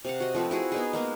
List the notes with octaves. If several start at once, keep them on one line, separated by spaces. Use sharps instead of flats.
C3 F5 F#5
F#4 D#5
F3 A3 C4 B4
E4 F#4 G#4
B3 D#4 G#4
G#3 A#3 B3